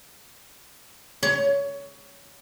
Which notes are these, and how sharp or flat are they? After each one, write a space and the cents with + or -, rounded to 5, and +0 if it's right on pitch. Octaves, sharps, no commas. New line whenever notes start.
C#5 +20